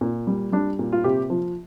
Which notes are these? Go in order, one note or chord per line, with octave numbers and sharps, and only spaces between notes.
A#2
G3
G3 D4
A#2
F4
C3 G4
F3